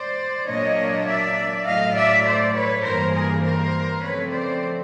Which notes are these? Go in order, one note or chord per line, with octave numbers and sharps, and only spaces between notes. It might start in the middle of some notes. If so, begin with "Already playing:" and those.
Already playing: C5 D5
A#2 F#3 A#3 D4 C#5 D#5
D5 E5
A2 F#3 A3 D#5 F5
D5 E5
C5 D5
B4 C#5
G2 E3 G3 A#3 A#4 C5
G#4 A#4
A#4 C5
C#3 F3 A3 C4 B4 C#5
C5 D5